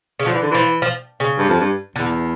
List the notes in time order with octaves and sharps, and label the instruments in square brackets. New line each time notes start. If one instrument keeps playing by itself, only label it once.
[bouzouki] C#3
[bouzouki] D3 [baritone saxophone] F3
[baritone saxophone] E3
D3
[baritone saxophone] E3 [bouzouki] F3
[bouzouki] F3
C#3
[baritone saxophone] G2
F2
G2
[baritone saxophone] E2 [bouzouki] D3